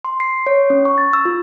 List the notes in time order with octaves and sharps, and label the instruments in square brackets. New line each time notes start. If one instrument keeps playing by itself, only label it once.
[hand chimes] C6
C7
C#5
C#4
C#6
A6
E6
F4